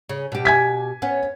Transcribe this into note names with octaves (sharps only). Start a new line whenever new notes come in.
C#3
B2 G4
G#5 G#6 B6
B3 C#4